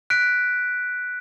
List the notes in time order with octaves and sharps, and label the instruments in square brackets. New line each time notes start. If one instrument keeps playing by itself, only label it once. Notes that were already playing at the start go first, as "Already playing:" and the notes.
[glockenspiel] F#6 B6 D7